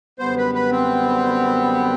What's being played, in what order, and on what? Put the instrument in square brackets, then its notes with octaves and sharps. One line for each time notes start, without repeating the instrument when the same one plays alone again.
[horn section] F#2 D3 G3 B3 [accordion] C5
[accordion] B4
B4
C4